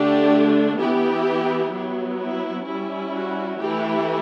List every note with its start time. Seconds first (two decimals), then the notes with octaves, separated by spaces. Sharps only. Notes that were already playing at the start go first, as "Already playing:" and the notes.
Already playing: D3 A3 D4 G4
0.77 E3 B3 E4 G4
1.71 F#3 B3 E4
2.18 E4
2.65 G3 C#4 E4
3.12 F#4
3.59 E3 A3 E4 G4